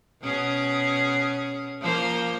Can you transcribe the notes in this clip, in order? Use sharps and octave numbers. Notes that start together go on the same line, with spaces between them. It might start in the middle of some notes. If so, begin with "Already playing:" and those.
B2 C#4 G#4
F3 A#3 C5